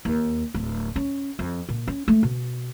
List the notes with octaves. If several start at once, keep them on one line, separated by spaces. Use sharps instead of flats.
D#2
D1
C#4
F2
A#2
C#4
A3
B2